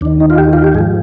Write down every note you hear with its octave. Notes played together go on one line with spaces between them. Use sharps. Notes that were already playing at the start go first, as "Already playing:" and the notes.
D#2 D#3 D4
D#4
F4
G4
F4
G4
G#2 F3 G#4